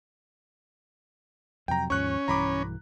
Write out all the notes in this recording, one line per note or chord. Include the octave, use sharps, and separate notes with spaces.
F2 C3 F#3 G5 A#5
D#2 G#2 F3 C#4 C#6 F#6
B1 G2 E3 A#5 B5 D6